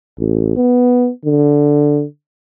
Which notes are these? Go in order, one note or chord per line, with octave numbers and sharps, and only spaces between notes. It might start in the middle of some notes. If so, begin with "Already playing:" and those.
A1
B3
D3